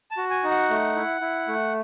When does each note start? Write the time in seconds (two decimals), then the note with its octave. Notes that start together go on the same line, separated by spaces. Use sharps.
0.11 A5
0.17 F#4
0.30 G#5
0.44 D#4
0.51 F#5
0.70 A3
0.96 E4
1.21 E4
1.48 A3